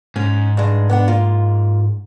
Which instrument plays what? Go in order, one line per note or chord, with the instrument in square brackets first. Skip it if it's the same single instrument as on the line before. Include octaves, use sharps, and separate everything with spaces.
[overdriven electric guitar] G#2 [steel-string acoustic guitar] C#4
[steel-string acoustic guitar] G2 G#3
B3 D4 F#5
A#3 F4